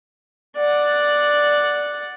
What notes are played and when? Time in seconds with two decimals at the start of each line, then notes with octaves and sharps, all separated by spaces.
0.57 D5 F#5